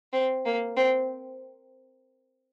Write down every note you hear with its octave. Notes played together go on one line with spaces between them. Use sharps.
C4
A#3
C4